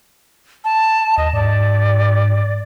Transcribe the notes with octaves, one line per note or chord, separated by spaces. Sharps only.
A5
D#2 D#5
G#2 D5